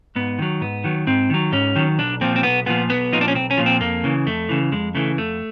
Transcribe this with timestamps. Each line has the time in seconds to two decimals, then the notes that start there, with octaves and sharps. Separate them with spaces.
0.16 G#2 B3
0.39 D#3 F#3
0.61 G#2 B3
0.84 D#3 F#3
1.07 G#2 C4
1.30 D#3 F#3
1.52 G#2 C#4
1.76 D#3 F#3
1.98 B1 D4
2.21 A#2 F3 C4
2.36 C4
2.43 B1 B3
2.66 A#2 F3 B3
2.89 B1 B3
3.12 A#2 F3 D#4
3.21 D4
3.28 C#4
3.35 B1 C4
3.51 C#4
3.57 A#2 F3
3.66 C4
3.80 F2 A#3
4.04 C#3 E3
4.26 F2 A3
4.49 C#3 E3
4.72 F2 G#3
4.95 C#3 E3 A3
5.17 F2 A3